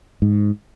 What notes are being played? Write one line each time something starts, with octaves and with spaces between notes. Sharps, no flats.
G#2